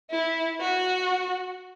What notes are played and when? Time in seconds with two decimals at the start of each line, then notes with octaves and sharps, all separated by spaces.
0.10 E4
0.60 F#4